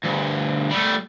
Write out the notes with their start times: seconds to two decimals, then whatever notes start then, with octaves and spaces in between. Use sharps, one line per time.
0.04 D2 G2
0.71 G3 A3